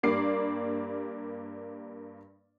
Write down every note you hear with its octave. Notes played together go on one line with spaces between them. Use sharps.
G2 G3 A#3 D5 D6 C7